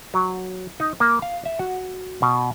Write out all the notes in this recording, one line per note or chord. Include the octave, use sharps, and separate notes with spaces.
F#3
D#4
A#3
F5
E5
F#4
B2